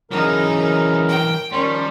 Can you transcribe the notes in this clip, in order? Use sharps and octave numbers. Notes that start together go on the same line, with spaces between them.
C#3 E3 F#3 C#4 D#4 A#4
A#4
G5
D#3 F3 G3 C#4 A#4 C6